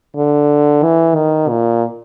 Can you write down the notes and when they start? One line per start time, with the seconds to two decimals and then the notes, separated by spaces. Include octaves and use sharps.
0.16 D3
0.83 E3
1.15 D#3
1.49 A#2